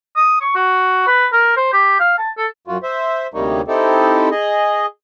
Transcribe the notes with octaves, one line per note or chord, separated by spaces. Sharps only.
D#6
C#6
F#4
B4
A#4
C5
G4
F5
A5
A4
F#2 F4 F#4
C5 E5
D2 C3 G3 A#3 D#4 C#5
C4 D#4 E4 G4 A4
G#4 D#5